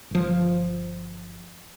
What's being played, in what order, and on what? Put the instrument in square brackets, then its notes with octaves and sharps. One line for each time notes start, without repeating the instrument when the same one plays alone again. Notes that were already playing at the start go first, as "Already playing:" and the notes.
[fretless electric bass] G1 F3